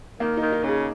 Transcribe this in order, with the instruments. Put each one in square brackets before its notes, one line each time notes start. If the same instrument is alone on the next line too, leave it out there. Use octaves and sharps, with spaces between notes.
[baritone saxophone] D#3 [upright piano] A#3
[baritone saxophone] D#3 [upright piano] D#4
[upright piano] D#4
[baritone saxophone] C#3 [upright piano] G#4